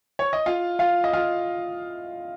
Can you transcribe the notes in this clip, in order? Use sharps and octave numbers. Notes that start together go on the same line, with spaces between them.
C#5
D#5
F4 F5
F4 F5
D#5
F4 F5